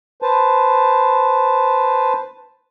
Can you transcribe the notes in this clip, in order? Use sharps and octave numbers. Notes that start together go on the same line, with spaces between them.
B4 C5 A5